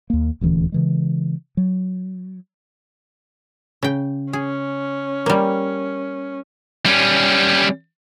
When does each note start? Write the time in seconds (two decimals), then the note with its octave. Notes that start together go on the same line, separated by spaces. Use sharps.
0.10 D#2 A#3
0.41 D#1 D2 E3 C#4
0.72 C#3 E3 G#3
1.57 F#3
3.83 C#3 G5
4.33 C#4 G#4
5.26 G3 A#3
6.86 G3 C#4